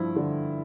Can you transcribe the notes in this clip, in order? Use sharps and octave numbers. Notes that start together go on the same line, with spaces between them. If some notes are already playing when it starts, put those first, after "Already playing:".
Already playing: G2 F3 E4
D3